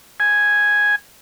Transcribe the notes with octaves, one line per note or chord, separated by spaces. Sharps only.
G#5